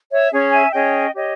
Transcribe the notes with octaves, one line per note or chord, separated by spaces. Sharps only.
C#5 E5
C#4 G#4 C#5
E5 G#5
C#4 G#4 C#5 D#5 G5
G4 C#5 D#5